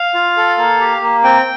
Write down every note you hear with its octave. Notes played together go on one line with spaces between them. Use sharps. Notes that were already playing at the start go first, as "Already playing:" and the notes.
Already playing: F5
F4
A4
A#3
G4
A#3
C4 G5